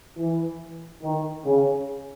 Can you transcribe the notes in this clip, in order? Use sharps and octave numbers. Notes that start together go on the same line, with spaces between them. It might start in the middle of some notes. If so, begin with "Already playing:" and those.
E3
D#3
C#3